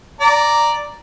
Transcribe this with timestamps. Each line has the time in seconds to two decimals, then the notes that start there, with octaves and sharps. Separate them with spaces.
0.21 D5 A#5